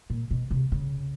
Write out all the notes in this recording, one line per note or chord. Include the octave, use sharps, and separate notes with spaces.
A#2
B2
C3
C#3